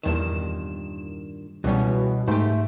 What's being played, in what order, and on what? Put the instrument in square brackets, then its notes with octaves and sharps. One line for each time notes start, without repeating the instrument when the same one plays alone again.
[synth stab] E2 E7 [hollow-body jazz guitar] G2 A#2 D#3
[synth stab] C#2 G3 [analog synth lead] B2 [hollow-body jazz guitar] E3 C#4
[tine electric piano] G#2 [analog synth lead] A3 [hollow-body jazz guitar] G4 C5